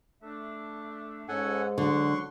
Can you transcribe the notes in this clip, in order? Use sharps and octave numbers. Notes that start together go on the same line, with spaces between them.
A3 D4 E5
G#2 C#4 A4 C#5 F#5 G#5
D3 F#3 F#5 C6 C#6